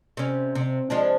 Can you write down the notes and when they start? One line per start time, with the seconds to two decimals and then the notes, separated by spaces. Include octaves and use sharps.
0.17 C3 C#4
0.55 C3
0.90 F3 G#3 D4